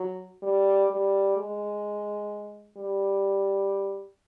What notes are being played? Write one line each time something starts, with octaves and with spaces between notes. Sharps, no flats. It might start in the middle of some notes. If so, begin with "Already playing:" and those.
Already playing: F#3
G3
G3
G#3
G3